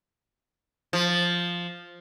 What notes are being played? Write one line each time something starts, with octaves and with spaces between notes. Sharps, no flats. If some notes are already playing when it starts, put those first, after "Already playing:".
F3